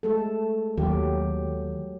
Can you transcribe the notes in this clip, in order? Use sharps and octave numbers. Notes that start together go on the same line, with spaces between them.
G#3 A3 A4
D#2 F#3 G4